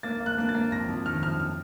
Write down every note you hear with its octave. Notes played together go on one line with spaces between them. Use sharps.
A#3 A6
A#3
F#6
A#3 F#6
A6
A#3
F2 A#6
F2
D#3 F6
F2 F6
F6